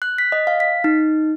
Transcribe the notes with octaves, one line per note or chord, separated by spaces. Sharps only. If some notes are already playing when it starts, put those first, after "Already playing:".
F#6
B6
D#5
F5
B6
D#4